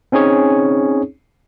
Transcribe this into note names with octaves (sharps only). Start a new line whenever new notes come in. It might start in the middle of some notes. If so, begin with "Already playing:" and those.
C4 C#4 D#4 G#4 C#5